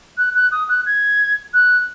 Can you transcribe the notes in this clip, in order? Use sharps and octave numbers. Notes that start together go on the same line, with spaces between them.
F#6
F#6
D#6
F#6
G#6
F#6